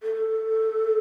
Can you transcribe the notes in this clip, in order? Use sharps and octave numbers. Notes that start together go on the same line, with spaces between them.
A4